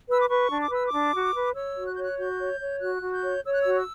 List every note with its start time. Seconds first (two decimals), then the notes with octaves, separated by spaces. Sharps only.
0.09 B4 E6
0.21 D6
0.29 B4 C#6
0.51 D4
0.61 D6
0.71 B4 E6
0.87 D6
0.93 D4
1.13 F#4
1.34 B4
1.55 C#5 E6
1.77 F#4
1.87 F#6
1.95 C#5 G6
2.03 F#6
2.18 F#4 G6
2.39 C#5
2.60 C#5
2.81 F#4 F#6
3.02 F#4
3.13 G6
3.23 C#5
3.44 C#5 E6
3.53 F#6
3.61 F#4 E6
3.76 E6